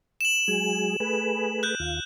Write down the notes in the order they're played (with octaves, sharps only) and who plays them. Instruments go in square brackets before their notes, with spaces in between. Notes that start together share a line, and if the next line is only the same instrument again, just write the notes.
[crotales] E7 F#7
[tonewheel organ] F#3 G#3 G#4
A3 G#4 B4
[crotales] F#6 G6
[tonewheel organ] D#2 F4